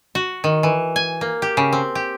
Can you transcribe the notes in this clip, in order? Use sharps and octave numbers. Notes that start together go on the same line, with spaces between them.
F#4
D#3
E3
G#5
A#3
G4
C#3
C4
G4